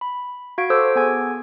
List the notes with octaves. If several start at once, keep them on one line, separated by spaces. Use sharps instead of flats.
B5
F#4 F5 G#6 D7
A4 C5 D6 E6
B3 G#4 G#5 G#6